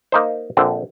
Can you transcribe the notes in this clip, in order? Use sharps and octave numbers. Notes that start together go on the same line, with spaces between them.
A#3 D#4 C5
A#1 D3 C4